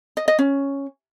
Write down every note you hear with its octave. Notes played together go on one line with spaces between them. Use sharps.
D#5
D#5
C#4